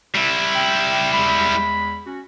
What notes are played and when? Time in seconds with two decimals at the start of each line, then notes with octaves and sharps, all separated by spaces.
0.15 G3 E4
0.54 G5
1.13 E2 G#3 B5
2.06 C#4 F#4